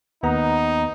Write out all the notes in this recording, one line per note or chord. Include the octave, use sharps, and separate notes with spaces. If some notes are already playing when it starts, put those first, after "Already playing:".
D#2 B3 D#4 A#5